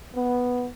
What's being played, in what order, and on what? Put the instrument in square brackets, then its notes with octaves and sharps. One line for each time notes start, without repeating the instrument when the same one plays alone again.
[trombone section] B3